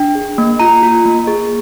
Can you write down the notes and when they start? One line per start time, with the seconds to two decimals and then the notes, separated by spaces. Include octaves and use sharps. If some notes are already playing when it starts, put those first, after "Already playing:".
Already playing: D4 G5
0.15 G#4
0.38 A#3
0.60 F4 A#5
0.83 F4
1.06 A#3
1.27 G#4